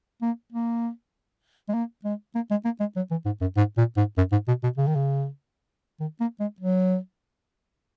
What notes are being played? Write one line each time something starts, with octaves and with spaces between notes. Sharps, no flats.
A#3
A#3
G#3
A#3
G#3
A#3
G#3
A#3
G#3
F#3
E3
G#2
F#2
G#2
A#2
G#2
F#2
G#2
B2
B2
C#3
D#3
C#3
D#3
A#3
G#3
F#3